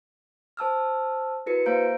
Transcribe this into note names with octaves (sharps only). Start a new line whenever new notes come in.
C5 A5 E6 F6
E4 F#4 A#4 B4 C#7
A#3 C5 F5 A#5 G6 D7